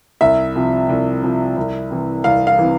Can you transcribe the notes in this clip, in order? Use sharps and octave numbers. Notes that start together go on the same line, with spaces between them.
C2 E5
C3 F3
C2
C3 F3
C2
C3 E3
C2 F5
F5
C3 E3